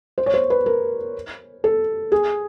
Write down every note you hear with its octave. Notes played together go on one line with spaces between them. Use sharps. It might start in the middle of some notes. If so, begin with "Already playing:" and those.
C5
C#5
C5
B4
A#4
A4
G#4